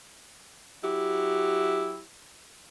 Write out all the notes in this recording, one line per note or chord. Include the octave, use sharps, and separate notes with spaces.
F#3 E4 G4